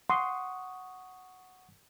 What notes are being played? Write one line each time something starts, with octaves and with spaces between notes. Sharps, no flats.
F#5 C6 C#6 D#6